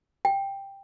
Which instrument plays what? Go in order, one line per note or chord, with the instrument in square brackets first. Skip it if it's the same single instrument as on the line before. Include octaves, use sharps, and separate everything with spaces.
[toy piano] G5